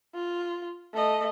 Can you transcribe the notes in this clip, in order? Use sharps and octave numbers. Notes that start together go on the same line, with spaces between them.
F4
A3 D#5